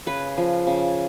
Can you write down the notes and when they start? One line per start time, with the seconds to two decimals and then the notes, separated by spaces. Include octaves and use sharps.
0.06 C#3 B4
0.38 F3
0.67 C#3